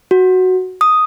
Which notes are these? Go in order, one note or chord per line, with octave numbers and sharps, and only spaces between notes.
F#4
D#6